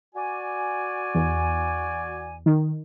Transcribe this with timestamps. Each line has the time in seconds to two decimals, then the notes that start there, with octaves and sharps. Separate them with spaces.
0.15 F#4 D5 G#5
1.15 E2
2.46 D#3